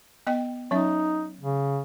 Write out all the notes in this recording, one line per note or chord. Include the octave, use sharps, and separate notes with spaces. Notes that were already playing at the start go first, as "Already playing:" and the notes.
B3 D#5 G5
F#3 C#4 D#4 E5
C#3